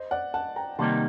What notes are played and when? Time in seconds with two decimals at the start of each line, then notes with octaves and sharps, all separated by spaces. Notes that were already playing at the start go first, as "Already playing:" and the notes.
Already playing: C5 D#5
0.11 D5 F#5
0.34 F#5 A5
0.56 G5 A#5
0.79 C3 D#3 G3 A#3 D#4 A5 C6